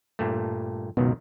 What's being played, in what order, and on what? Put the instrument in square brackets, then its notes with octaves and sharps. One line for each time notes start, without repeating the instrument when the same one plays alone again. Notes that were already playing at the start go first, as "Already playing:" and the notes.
[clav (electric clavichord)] G2 A#2 A3
[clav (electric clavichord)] C#2 F#2 D#3 [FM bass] B2